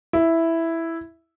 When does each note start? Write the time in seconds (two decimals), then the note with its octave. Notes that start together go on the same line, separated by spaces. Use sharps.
0.13 E4